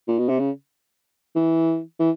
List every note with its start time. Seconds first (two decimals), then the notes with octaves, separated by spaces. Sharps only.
0.08 A#2
0.19 B2
0.29 C3
0.39 C#3
1.36 E3
2.00 E3